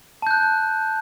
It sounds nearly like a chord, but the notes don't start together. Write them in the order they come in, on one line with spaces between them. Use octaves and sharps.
A5 G6 F#6